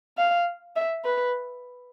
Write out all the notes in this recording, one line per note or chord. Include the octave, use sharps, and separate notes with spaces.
F5
E5
B4